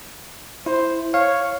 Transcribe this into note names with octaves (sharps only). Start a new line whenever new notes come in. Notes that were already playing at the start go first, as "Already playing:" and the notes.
E4 C5
C#5 F5